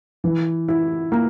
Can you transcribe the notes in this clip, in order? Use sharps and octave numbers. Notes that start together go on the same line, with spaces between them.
E3
E4
A#3